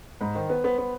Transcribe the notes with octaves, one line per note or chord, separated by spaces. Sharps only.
G#2 B5
D#3 C5
B3 B4
B3 C5
B3